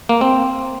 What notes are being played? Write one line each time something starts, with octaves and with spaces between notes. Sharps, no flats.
A#3
C4